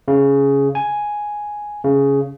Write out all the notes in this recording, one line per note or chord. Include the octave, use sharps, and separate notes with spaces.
C#3
G#5
C#3